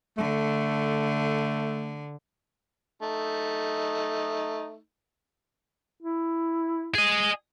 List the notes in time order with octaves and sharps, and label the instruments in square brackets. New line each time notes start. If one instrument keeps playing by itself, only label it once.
[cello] D3 [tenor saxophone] A3
[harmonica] A3 D#4
[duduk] E4
[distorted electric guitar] G#4 D#5